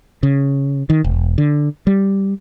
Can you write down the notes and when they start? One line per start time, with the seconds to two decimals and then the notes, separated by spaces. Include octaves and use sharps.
0.23 C#3
0.90 D#3
1.04 E1
1.38 D3
1.87 G3